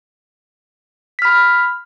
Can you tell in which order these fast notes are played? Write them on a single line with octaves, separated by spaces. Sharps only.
B6 F6 B5